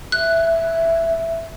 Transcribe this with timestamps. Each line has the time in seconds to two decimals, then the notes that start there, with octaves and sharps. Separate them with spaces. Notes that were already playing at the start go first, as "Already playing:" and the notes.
0.12 E5 F#6